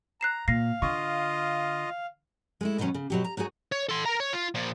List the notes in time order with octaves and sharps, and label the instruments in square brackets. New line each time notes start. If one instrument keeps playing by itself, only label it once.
[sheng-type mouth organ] A#5 [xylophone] F#6 C7 E7
[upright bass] A#2 [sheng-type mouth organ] F5 [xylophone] A#6 C7
[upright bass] D3 [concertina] F4 D#5 [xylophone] C#6
[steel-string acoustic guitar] G#3 A3 E4
B2 D#3 E3 F#3 C#4
C#3
B2 F#3 G4
A#5
F#3 D#4 F#4 G#4
[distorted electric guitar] C#5
A4 C6
A#4 A#5
C#5
F4
A#2 F3